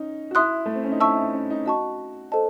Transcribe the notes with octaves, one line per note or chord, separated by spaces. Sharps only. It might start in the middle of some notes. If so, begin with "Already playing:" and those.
Already playing: C#4 D#4
F#4
E4 E5 C6 D#6 F#6
A3
C4
C#4
D#4
E4 E5 A5 C#6 E6
D#4
C#4
D#4
F#4 D#5 A5 C#6
A4 C5 D#5 A5